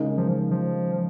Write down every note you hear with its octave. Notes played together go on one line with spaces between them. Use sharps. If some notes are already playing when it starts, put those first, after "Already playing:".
Already playing: C#3 G#3 D#4 A#4 D#5
F3
F3